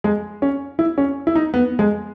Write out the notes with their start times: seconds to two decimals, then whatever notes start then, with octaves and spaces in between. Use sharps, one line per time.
0.04 G#3
0.42 C#4
0.79 E4
0.98 C#4
1.27 E4
1.36 D#4
1.54 B3
1.79 G#3